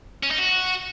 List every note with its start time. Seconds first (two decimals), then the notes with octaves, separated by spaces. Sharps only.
0.23 C#4
0.31 D#4
0.39 F#4